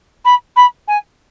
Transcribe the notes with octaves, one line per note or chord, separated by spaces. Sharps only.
B5
B5
G#5